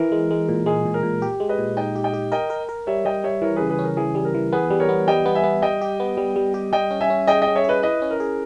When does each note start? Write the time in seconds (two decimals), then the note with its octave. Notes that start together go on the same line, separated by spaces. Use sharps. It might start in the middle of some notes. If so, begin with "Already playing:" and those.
Already playing: E3 A#4
0.12 G#3
0.31 G#3
0.49 A#2
0.66 G#3 G#4
0.86 A#2
0.94 A#4
1.03 A#2
1.22 G4
1.40 G#3
1.49 B4 D#5
1.58 A#2
1.77 D#4 D#5 G5
1.96 G4
2.04 D#5 G5
2.14 G4
2.32 A#4 D#5 G5
2.50 A#4
2.69 A#4
2.87 G3 C#5 E5
3.05 G3 D#5 G5
3.24 G3 C#5 E5
3.42 E3 A#4 C#5
3.56 G#4 B4
3.61 C#3
3.70 G#4 B4
3.79 C#4
3.84 A#4
3.97 E3 G#4
4.15 G3 G#4
4.25 A#4
4.35 E3
4.52 B3 G#4 B4
4.70 G3
4.80 A#4 C#5
4.89 B3
5.08 G3 D#5 G5
5.26 B3
5.35 E5 G#5
5.44 B3
5.62 G3 D#5 G5
5.82 G4
6.00 B3
6.17 G3
6.36 G3
6.54 G4
6.73 G3 D#5 G5
6.91 C#4
7.01 E5 G#5
7.10 C#4
7.27 G#4 D#5 G5
7.42 D#5 G5
7.47 C#4
7.55 C#5 E5
7.64 G#4 B4 D#5
7.82 E4 B4 D#5
8.02 C#4
8.11 A#4
8.20 G#4